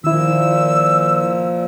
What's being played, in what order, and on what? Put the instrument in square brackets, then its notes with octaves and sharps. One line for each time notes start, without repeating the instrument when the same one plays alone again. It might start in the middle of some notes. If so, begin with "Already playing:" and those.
[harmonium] A#2 F3 [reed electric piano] D#3 E4 [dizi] E6